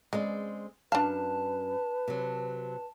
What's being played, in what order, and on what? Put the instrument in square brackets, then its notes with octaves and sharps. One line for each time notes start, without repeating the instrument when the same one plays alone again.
[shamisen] C#3 [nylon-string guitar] G#3 C4 D5
[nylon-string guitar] F#2 [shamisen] D4 F5 [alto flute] B4 [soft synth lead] A5
[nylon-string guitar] C3 F#3